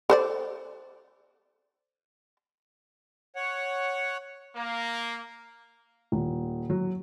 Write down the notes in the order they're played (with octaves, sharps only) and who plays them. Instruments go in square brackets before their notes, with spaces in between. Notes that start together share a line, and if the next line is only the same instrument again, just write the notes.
[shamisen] A4 C5 D5
[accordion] C#5 F#5
[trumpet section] A#3
[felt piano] D#1
F#3